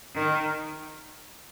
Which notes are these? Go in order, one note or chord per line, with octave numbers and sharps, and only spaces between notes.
D#3